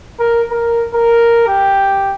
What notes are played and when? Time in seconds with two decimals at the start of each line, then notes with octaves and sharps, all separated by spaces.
0.20 A#4
0.51 A#4
0.94 A#4
1.48 G4